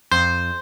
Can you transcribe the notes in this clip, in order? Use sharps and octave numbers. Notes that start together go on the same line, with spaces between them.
F2 C5